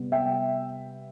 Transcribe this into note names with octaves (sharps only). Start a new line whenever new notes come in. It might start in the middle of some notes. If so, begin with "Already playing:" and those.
Already playing: C3 G3 B3
E5 G5